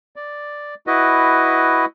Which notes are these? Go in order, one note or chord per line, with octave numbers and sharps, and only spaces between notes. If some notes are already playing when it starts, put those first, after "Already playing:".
D5
E4 F#4 B4 D#5